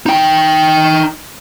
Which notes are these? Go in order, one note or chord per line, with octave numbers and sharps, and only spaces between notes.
D#4 G5